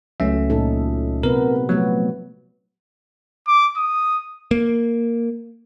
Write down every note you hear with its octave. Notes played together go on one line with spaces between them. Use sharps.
C#2 F#3 A3 C#4 E5
A#2 D#4 A4
C3 B3 A#4 B4
F3 F#3 A3 B3 F#4
D6
D#6
A#3